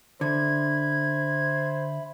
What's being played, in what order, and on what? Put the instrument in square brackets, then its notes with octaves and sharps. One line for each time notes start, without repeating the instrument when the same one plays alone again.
[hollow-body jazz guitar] D3 [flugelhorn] C5 [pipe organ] E5 B5 [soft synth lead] G#6